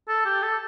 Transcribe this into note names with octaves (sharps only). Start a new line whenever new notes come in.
A4
G4
A4